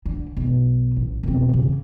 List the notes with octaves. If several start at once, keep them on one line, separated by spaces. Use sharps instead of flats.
D3
B1
A1
E1 C4
C#3 E3